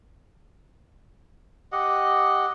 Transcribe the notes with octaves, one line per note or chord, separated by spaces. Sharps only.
G4 D#5 F#5